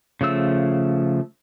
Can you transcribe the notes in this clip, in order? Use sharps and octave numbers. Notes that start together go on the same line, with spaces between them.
C#3 F3 A3 E6